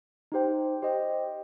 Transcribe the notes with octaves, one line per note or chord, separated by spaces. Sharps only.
D#4 G4 C5 G5
G4 C5 D#5 G5